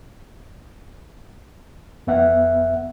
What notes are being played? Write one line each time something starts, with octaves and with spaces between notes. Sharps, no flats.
F2 B3 E5 F#5